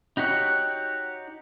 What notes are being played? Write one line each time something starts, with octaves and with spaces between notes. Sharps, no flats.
D#4 F#4 G4 C#5 F#6